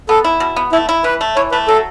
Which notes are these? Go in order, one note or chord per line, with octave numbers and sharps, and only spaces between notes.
B3 A4
E4
B2
B3
A3 E4
E4
E3 B4
A3
E3 C#5
A3 B4
F#3 A4